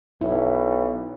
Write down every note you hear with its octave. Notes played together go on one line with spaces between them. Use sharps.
B1 E4